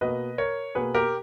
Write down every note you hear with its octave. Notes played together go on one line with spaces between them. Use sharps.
B2 A#3 B4 D#5
A#4 C#5
B2 A#3 G#4 B4
G4 A#4